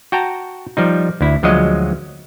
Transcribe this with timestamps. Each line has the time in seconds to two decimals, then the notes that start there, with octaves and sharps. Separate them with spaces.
0.12 F#4 G5 A5 A#5
0.77 F3 G3 D#4
1.21 D2 E4
1.43 D2 F3 F#3 G#3 D#5